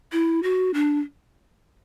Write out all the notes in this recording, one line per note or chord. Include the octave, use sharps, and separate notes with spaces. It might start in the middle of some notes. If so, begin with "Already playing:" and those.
E4
F#4
D4